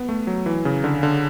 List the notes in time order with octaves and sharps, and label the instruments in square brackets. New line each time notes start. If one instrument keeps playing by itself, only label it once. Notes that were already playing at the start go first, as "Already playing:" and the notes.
Already playing: [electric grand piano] B3
A3
F#3
E3
C#3
D3
D3